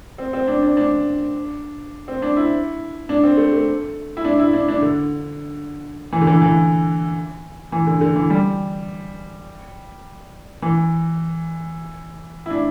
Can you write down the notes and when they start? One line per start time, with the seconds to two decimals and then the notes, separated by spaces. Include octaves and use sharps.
0.18 C4
0.33 C4
0.47 D4
0.63 D4
0.77 D4
2.08 C4
2.22 D4
2.37 E4
3.09 D4
3.23 C4
3.37 A3
3.52 A3
4.17 E4
4.25 D4
4.39 E4
4.53 D4
4.68 D4
4.82 D3
6.12 E3
6.21 D3
6.27 E3
6.41 E3
7.72 E3
7.87 D3
8.01 D3
8.16 E3
8.30 G3
10.62 E3
12.46 E4
12.50 D4